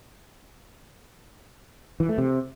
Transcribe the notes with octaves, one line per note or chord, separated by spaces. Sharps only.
E3
A3
C3